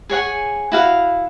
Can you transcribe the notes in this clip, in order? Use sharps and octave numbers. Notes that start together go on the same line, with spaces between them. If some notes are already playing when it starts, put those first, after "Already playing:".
G#4 C#5 F#5 G#5
E4 F#4 F5